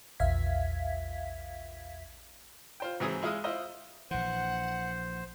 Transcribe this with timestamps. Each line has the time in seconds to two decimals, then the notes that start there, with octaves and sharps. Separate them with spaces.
0.20 A#1 E2 E5 F5 G#6 B6
2.80 F4 C5 G5
3.00 G#2 E3 F#3 C4 G#4 D#6
3.23 G#3 E4 F5 D#6
3.44 E4 F4 C5 D#5
4.11 A#1 E3 C5 F#5